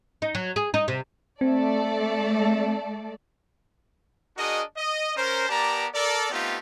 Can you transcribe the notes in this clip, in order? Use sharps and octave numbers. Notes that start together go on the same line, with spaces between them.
D#4
F#3
G#4
D#4
C3
A3 C4 A4 D5
D4 F#4 G#4 A#4 D#5
D#5
C#4 A#4 C5
B3 G4 A#4 D5 A5 A#5
A4 A#4 D5
A3 B3 C4 D#4 F4 G4